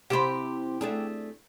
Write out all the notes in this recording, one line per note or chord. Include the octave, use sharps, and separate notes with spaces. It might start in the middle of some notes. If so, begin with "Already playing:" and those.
C3 E4 G4 C5 B5
A3 D4 G#4